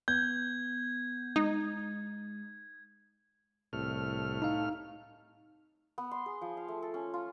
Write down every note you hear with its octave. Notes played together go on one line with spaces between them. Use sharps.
B3 G6 G#6
G#3 D#4
C2 A2 F6
D#4 F5
B3
C6
G#4
F3
F5
A3
A4
C#4
F4